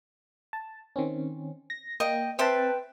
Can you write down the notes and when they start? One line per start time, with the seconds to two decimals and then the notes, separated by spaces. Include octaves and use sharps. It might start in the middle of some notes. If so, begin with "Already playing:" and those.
0.53 A5
0.96 D#3 C4 C#4
1.70 A#6
2.00 A#3 D#5 G5
2.39 C4 B4 E5 G5 A5 C6